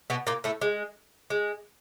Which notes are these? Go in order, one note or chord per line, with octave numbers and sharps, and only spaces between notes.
B2 B3
A#2 A#3
A2 A3
G#3
G#3